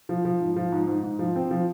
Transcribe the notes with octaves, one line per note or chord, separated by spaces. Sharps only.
F3
F3
G#2
F3
G#2
G#2
G#2
F3
C4
F3